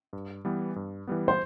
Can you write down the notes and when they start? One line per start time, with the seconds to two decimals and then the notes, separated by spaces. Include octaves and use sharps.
0.13 G2
0.45 E3 G3 B3
0.76 G2
1.07 E3 G3 B3
1.28 C5